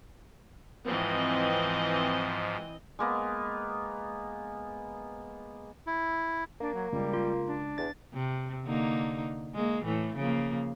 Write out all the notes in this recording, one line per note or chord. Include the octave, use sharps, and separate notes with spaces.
G#2 E3 F3 C4 D#5
G#3 A#3 B3
E4
A#3 D4
F#3
C#2 G3
F4
D4
E2 A6
C3
D3 A#3 D#4
G#3 A#3
A2 E3 A3
C#3 F3 A#3